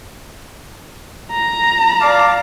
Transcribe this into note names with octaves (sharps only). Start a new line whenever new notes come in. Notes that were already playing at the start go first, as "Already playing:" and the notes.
A#5
D5 F5 D6